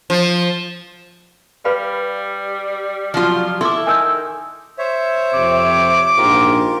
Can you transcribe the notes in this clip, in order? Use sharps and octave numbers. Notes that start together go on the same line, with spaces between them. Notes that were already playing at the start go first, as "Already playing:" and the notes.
F3
G3 B4 F5 B5
F3 F#3 F4
E4 A4 C6 D6
D#3 G#5 E6 G6
C5 C#5 E5
F2 C3 D6
A#1 G#2 F4 G4 A#4